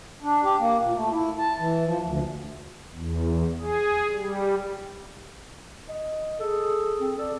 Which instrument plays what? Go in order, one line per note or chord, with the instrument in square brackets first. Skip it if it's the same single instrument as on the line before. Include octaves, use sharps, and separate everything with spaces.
[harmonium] D4
G4
A#3
A#2
A3
E4
A5
E3
F3
D2
[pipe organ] E2
G#4
G3
[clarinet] D#5
[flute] G#4 [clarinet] A4
[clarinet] C4
[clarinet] A4 [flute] D5